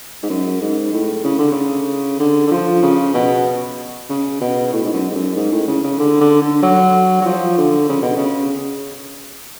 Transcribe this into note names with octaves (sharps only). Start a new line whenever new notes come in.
G#2
F#2
G#2
A2
C#3
D3
C#3
D3
D3
F3
C#3
B2
C#3
B2
A2
G#2
F#2
G#2
F#2
G#2
A2
C#3
C#3
D3
D3
D3
F#3
F#3
F3
D3
C#3
B2
C#3